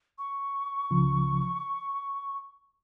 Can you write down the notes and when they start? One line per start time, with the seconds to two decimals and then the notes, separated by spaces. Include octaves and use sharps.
0.19 C#6
0.90 C#2 C#3 F3